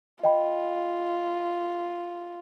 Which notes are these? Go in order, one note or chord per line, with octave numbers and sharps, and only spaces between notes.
F4 D#5 G5 B5